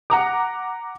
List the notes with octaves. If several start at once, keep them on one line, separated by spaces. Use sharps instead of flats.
F#5 A#5 D6